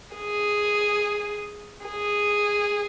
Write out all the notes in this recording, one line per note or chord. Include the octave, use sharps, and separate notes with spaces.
G#4
G#4